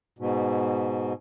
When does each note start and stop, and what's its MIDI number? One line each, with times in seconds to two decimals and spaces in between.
0.19 1.13 44
0.19 1.13 47